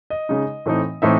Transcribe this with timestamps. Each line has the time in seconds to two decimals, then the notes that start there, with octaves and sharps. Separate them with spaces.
0.10 D#5
0.29 C#3 G#3 D#4
0.66 A2 E3 A3 C4 D#4
1.02 A2 E3 A3 C4 D#4 E5